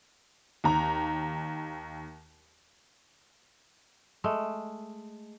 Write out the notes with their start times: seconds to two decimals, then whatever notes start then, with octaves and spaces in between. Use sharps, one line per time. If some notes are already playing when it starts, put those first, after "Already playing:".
0.64 D#2 A#5
4.24 G#3 A3